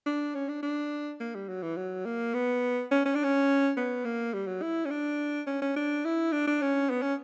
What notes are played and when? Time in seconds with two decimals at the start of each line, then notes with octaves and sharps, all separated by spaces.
0.06 D4
0.35 C#4
0.49 D4
0.63 D4
1.20 A#3
1.35 G3
1.48 F#3
1.62 E3
1.77 F#3
2.05 A#3
2.34 B3
2.91 C#4
3.05 C#4
3.15 D4
3.24 C#4
3.77 B3
4.05 A#3
4.33 G3
4.47 F#3
4.62 E4
4.85 C#4
4.90 D4
5.47 C#4
5.62 C#4
5.76 D4
6.05 E4
6.32 D4
6.47 D4
6.62 C#4
6.90 B3
7.02 C#4